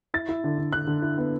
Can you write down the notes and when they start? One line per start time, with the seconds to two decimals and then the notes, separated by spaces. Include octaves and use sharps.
0.14 E4 A6
0.29 E4
0.44 D3
0.59 D3
0.73 D3 F#6
0.87 D3
1.02 E4
1.18 B3